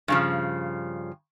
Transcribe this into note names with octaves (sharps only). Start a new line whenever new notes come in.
G2 C#3 F3